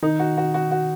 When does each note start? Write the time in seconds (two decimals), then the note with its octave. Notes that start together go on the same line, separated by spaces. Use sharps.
0.03 D#3 D#4
0.19 F#4
0.37 F#4
0.54 F#4
0.71 F#4